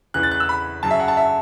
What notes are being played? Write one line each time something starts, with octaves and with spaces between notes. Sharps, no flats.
E2 C#3 E3 F#6
A6
F#6
E6
B5
F#2 C#3 F#3 A5
E5
F#5
A5
E5